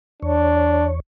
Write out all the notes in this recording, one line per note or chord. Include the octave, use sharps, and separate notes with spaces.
E2 D4 C#5